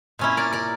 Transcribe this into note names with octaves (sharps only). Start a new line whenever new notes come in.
A#2 C#4 E4
A#4 D5
A#4 D5